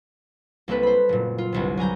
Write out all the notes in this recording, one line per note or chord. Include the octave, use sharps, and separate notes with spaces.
C2 A#3 C4 A4 B4
C5 B5
F#1 A#2
F4
G1 C2 C3
F#3 G#5 A#5 G6